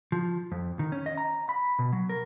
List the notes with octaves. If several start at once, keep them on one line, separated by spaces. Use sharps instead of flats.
F3
F2
D#3
C#4
D#5
A#5
B5
B2
F#3
A#4